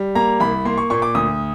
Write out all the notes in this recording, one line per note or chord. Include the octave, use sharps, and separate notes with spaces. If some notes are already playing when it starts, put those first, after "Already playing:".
Already playing: G3
A#3 A#5
C2 B5
A#3 C6
C#6
A#2 C#6
D6
D2 D#6